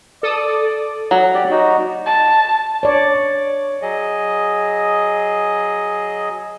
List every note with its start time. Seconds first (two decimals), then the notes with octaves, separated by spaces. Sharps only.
0.23 A4 D5 D#6
1.11 F#3
1.35 G4 D5
1.50 D#4 F#4
2.06 A5
2.83 C#5 D5
3.82 F#3 G#4 D#5